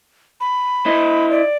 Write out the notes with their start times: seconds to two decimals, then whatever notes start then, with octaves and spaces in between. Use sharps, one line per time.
0.40 B5
0.86 E4 C5 D#5
1.30 D5